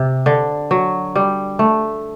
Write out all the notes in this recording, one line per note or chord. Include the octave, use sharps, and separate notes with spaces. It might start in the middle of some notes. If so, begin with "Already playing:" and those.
Already playing: C3
D3
F#3
G3
A3